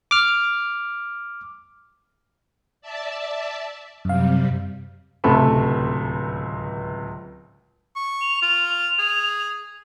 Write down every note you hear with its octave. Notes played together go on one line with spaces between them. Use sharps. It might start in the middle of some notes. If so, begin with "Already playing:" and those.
D6 F6
D5 E5 A5
F#2 C3 G3 F5
D1 C#2 C3 A3 A5 B5
C#6
F7
F4
G#4